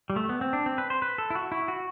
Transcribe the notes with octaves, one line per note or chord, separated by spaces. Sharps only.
G3
A3
B3
C4
D4
C4
B4
C5
B4
A4
E4
F#4
E4
F#4